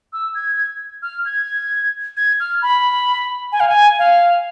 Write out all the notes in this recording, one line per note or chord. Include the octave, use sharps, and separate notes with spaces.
E6
G#6
F6
G#6
G#6
F6
B5
G#5
F5
G#5
F5